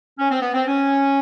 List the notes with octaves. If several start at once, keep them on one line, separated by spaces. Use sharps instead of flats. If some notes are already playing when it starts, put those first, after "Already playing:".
C#4
C4
B3
C4
C#4